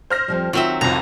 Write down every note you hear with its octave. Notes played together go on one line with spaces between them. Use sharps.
C5 F6 A#6
F2 F3 G3
D#3 F#3 C4 F4 E5
C2 F2 A#5